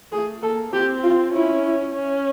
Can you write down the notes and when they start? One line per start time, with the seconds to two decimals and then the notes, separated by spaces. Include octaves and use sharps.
0.12 A3 G#4
0.42 A#3 A4
0.73 C4 G4
1.03 F4
1.33 C#4 E4
1.95 C#4